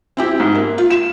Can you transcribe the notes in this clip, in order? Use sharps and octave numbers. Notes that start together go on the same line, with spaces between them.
C4 E4 G4
G#2
A#3 E5
F4
E7